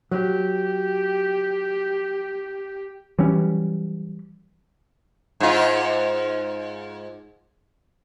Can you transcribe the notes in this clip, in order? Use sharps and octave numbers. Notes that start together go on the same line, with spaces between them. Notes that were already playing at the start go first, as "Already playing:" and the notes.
F#3 G4
E3 F#3 G3 C#4
G#2 F4